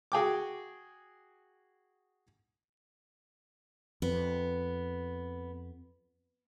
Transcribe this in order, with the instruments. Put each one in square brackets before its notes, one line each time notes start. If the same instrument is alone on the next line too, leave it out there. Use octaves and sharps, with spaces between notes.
[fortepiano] F#4 G#4 G5 D6
[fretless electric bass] F2 [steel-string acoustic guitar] B3